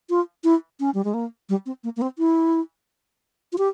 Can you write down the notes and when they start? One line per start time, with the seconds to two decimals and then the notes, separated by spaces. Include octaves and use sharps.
0.10 F4
0.44 E4
0.80 C#4
0.94 G3
1.04 G#3
1.14 A#3
1.49 G3
1.66 C4
1.84 A#3
1.96 A#3
2.02 C4
2.18 E4
3.52 F4
3.58 G4